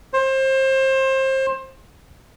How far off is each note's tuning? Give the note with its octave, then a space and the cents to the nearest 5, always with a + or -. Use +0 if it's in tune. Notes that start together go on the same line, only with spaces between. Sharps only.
C5 +30